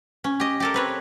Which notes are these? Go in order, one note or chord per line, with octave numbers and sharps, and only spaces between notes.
C#4
G4 D#5
G4 A4 A#4
C4 B4 C#5